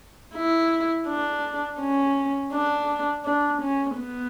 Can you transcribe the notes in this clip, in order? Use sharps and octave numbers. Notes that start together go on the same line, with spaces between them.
E4
D4
C#4
D4
D4
C#4
B3